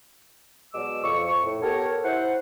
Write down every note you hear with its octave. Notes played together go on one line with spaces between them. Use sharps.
B2 F#3 G#3 D5 D6 E6
F2 C#6
A2
B3 G4 A4 A#4 C#5
E4 C5 F#5